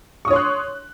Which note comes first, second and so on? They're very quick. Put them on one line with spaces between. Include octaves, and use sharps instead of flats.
C#6 D#6 C#5 C6 F#6